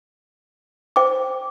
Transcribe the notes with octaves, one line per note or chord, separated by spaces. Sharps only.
C5 G5 D6